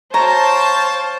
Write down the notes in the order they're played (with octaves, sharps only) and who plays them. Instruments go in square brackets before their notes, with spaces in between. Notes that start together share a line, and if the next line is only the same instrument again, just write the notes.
[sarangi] C5 [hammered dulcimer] C#5 [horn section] F5 G5 A5 [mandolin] A#5